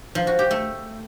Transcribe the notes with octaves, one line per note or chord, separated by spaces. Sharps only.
F3
F#4
G4
A3